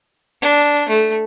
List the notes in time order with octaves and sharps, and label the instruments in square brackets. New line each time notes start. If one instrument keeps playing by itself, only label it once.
[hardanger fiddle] D4
A3